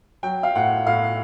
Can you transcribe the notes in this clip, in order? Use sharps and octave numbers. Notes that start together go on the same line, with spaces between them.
F#3 G5
F5
A2 F#5
A2 F5